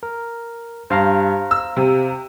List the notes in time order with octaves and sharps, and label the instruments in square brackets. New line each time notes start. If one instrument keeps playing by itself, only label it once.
[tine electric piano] A#4
[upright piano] G2 [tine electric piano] C5 F5 A#5
[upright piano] E6
C3